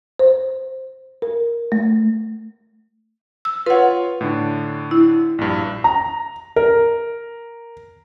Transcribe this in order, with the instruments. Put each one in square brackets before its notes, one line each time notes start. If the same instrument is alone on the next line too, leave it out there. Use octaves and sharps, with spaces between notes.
[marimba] C5
A#4
A3
E6
[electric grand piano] F4 C#5 [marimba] B4 F#5
[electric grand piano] A2 D3 D4
[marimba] E4
[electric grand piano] A#1 G2
[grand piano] A#5
A#4